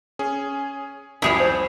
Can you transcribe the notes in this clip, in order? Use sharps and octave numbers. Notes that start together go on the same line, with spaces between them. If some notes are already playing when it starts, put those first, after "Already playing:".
C#4 G#4
C2 F2 E4 G#4 C#5
C5